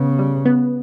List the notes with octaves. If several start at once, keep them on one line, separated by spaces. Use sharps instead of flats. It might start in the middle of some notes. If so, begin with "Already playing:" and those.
Already playing: C#3 B3
G3
B3